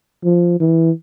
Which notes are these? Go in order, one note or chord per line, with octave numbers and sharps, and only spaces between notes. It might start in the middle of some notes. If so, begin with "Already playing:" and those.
F3
E3